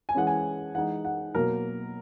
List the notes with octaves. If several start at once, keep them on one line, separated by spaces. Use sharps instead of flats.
G#5
E3 G#3 C#4 F#5
G#5
E3 G#3 D#4 F#5
F#5
B2 F#3 A#3 A#4